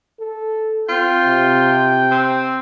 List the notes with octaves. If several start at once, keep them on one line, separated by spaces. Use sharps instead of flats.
A4
C4 F4 G5
C3
C4